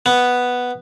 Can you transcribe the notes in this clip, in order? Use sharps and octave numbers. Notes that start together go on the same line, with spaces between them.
B3